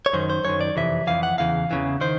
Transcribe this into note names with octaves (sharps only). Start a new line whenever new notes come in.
C#5
F#2 D#3 C5
C5
F#2 D#3 C#5
D5
F2 C3 E3 E5
F2 C3 E3 F5
F#5
E2 C#3 E3 F5
E2 C#3 E3
D#3 C5